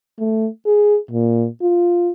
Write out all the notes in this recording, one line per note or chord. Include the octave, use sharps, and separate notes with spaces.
A3
G#4
A#2
F4